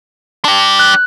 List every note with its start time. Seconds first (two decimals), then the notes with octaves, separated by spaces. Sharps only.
0.45 D4 G4
0.79 F#6